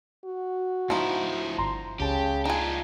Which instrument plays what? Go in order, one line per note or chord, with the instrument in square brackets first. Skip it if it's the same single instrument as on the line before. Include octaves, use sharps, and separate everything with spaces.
[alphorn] F#4
[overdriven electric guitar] D2 E4 [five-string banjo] F3 D#4
[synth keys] G1 A#5 C6
[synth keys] C#2 A5 [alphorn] C#3 [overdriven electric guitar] G4
[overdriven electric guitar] D4 F4 [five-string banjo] D#4 G#4